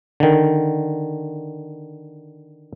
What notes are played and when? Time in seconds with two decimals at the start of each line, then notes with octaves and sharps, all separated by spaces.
0.20 D3 D#3